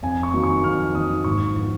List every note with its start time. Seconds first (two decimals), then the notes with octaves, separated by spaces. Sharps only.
0.03 F2 G#5
0.23 C#6
0.33 D#3 F#3 A#3
0.44 C#6
0.64 F2 F6
0.94 D#3 F#3 A#3 D#6
1.24 G#2 C#6
1.55 F3 B3